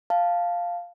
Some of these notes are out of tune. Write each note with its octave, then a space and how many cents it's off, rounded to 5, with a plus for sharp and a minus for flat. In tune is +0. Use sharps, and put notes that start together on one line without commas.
F5 +0 A5 +0